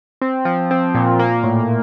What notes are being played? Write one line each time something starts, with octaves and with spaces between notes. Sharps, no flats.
C4
F3
C4
A#2
A#3
A2